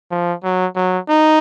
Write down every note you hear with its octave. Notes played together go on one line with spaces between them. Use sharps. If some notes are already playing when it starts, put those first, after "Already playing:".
F3
F#3
F#3
D#4